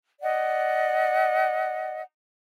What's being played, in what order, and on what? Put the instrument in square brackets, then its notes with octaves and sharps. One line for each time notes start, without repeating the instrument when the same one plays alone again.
[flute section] D5 D#5 F#5